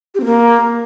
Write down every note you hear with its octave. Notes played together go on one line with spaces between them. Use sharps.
G4
C4
A#3